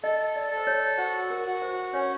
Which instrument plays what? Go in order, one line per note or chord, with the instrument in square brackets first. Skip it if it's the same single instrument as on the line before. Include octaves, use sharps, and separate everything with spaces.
[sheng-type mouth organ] A4 [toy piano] D#5
[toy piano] D5
[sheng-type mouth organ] A4
[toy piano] C5
C#5
[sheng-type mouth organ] F#4 [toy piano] C5
[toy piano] A#4
[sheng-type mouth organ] F#4
[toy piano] C5
[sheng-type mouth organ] C#4 [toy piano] C#5